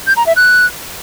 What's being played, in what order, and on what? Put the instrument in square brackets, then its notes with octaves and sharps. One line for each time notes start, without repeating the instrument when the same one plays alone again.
[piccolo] G6
A#5
E5
F#6